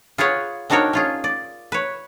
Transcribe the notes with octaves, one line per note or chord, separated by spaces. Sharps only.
F4 G#4 B4 C#5 F#5
C4 D4 D#4 F#4 A#4 C#5
C#4 F4 G#4
D5
B4 C#5